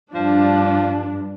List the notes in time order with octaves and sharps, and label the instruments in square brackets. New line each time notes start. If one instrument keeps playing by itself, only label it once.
[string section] G2 [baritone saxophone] F3 [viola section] D4